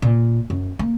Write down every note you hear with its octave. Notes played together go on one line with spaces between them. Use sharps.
A#2
F#2
A#3